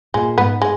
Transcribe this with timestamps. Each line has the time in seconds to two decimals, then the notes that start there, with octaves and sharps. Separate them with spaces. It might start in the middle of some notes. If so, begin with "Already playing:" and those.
0.14 A#2 G#3
0.38 G#2 B3
0.62 G#3